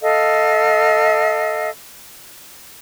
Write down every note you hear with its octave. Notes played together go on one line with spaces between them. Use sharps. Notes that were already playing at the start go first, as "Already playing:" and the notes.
A4 D#5 F5